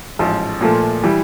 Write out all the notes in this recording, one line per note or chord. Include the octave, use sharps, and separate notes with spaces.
A1 G#2 F3
A#2 F3 A3
E3 G3